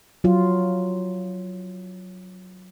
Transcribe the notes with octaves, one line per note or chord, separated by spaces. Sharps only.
F#3 F4